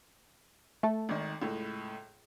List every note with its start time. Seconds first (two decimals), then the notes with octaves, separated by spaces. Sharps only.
0.83 A3 A4
1.09 G#1 D#3
1.42 C#2 A2